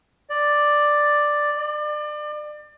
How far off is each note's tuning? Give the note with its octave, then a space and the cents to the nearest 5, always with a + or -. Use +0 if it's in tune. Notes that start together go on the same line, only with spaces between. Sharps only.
D5 +5
D5 +30